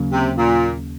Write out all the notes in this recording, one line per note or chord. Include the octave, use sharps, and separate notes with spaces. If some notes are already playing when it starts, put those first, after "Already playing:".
Already playing: D#2 C#3 F#3 A#3
C3
A#2